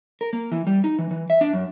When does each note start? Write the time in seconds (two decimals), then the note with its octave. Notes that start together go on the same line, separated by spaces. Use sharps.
0.21 A#4
0.33 A#3
0.52 E3
0.67 G3
0.84 D#4
0.99 E3
1.11 E3
1.30 E5
1.41 D4
1.53 F#2